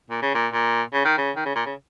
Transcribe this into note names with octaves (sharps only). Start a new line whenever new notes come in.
A#2
C#3
A#2
A#2
C#3
D#3
C#3
D#3
C#3
A#2
C#3